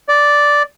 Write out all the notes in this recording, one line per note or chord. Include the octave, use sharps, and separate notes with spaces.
D5